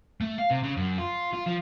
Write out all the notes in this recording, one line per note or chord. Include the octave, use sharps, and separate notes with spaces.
A3
F5
C3
C#3
F#2
F4
F4
F3